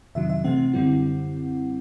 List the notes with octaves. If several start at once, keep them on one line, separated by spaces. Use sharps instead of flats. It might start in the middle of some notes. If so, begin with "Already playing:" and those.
F2 C3 D#3 F#3 E5
E5
C3 E3 A3 C4 F#5
F#2 D3 G3 C4 E4